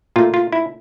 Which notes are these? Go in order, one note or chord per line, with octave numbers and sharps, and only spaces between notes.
A#2 A3 F4
F4
E4